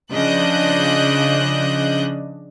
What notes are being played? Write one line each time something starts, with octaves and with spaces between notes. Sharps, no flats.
C#3 F3 D4 D#5 F#6 G6